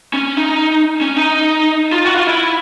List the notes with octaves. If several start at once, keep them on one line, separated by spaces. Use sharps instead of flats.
C#4
D#4
C#4
D#4
F4
F#4
F4
E4